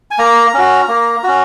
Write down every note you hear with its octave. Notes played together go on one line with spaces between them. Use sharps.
G#5
A#3 A#5
C#4 F#4
A#3
C#4 F#4